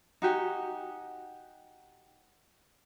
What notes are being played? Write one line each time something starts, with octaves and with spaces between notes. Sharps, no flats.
D#4 F#4 G4 G#5